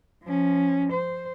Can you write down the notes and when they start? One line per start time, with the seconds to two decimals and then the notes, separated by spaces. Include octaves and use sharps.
0.24 F3 C#4
0.93 C5